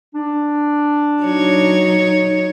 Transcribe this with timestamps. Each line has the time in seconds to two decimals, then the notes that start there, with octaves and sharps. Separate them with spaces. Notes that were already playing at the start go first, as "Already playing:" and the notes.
0.15 D4
1.22 F#3 D#4 C#5